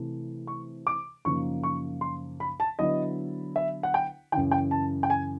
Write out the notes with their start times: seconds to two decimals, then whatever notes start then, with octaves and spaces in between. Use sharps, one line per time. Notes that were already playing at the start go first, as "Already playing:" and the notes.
Already playing: C3 E3 A3
0.47 C#6
0.87 D6
1.25 F#2 C#3 F3 A#3 D#4 C#6
1.63 C#6
2.01 C6
2.40 B5
2.60 A5
2.79 D3 F#3 B3 E4 D#5
3.56 E5
3.83 F#5
3.94 G5
4.32 E3 G5
4.35 F#2 C#3
4.51 G5
4.71 A5
5.03 G5
5.10 G#5